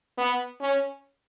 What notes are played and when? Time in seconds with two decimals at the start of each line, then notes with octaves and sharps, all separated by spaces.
0.18 B3
0.61 C#4